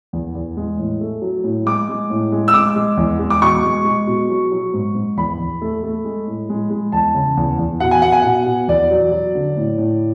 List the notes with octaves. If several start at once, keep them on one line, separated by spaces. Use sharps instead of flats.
E2
E2
G#3
A2
A3
F#3
A2
G#3 D6
G#3
A2
G#3
E6
G#3 D6
G#3
E2
G#3
D6
B2 C#6
G#3
G#3
B2
F#3
F#3
G#2
G#2
E2 B5
E2
A3
A3
G#3
A2
G#3
G#3
E2 A5
C#3
E2
E2
B2 F#5
G#5
B2 F#5
G#5
B2 F#5
B2
E2 D5
F#3
F#3
D3
A2
A2